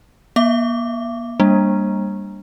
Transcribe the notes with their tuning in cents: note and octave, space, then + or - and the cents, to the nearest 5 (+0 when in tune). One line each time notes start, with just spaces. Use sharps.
A#3 +45 E5 +40 D6 +0
G3 +20 A#3 +0 D4 +0